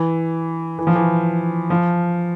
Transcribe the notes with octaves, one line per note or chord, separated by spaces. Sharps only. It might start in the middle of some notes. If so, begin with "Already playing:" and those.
Already playing: E3
E3
F3
E3
F3